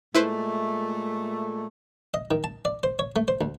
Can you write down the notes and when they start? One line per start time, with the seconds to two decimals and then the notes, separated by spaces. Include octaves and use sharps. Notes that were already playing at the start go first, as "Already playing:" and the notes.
0.15 A#2 G#3 A3 E4 B4 C5
2.14 D#5
2.31 D#3
2.44 A5
2.65 D5
2.83 C5
2.99 C#5
3.16 A3
3.28 C5
3.41 D2